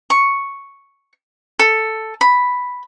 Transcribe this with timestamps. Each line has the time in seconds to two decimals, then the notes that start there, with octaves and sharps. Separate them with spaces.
0.10 C#6
1.59 A4
2.21 B5